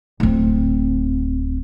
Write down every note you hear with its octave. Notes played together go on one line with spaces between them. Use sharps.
D1 C4